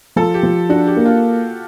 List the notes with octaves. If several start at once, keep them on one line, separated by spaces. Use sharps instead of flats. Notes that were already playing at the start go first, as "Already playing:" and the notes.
F3 A4
G4
F3
D4 F#4
G4
A#3
F4